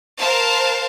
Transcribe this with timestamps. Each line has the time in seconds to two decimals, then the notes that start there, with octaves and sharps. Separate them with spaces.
0.19 A#4 C5 F5 A5